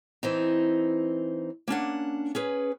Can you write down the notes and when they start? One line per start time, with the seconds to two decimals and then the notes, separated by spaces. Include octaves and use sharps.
0.23 E3 C4 D#4
1.68 A#3 C#4 D4 F#5
2.35 C#4 G#4 B4